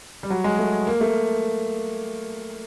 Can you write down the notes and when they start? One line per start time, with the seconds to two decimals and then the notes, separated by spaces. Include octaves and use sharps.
0.23 G3
0.30 F#3
0.44 G#3
0.59 A3
0.87 A#3
1.01 A3